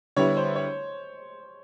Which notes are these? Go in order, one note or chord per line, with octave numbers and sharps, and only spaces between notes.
D3 G3 B3 E4 C#5
C5
C#5